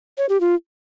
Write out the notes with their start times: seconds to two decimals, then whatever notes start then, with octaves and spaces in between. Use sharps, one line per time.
0.18 C#5
0.29 G4
0.40 F4